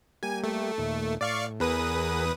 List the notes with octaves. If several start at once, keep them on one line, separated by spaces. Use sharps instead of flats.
G3 A#3 G4 G#5
A3
D#2 A#2
A2 D5 F5 C#6
E2 B3 G#4 A#4 B4 D#6